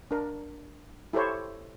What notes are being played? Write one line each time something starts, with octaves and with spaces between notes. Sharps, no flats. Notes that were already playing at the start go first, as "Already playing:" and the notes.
D4 A#4
E4 G4 A4 C5 C#5